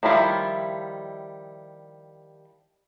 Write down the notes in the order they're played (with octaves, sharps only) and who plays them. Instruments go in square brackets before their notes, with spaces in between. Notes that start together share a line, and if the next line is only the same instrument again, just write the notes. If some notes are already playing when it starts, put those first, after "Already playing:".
[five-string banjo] D#3 F3 G3 E4 F4